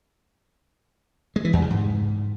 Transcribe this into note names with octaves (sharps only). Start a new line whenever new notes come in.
G#3
E3
E2
C#3
G#2